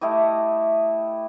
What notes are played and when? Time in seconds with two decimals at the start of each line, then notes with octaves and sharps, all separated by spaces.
0.01 A3 E4 G4 D#5